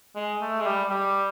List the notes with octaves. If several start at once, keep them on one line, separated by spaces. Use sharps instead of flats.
G#3
A3
G#3
G3
G3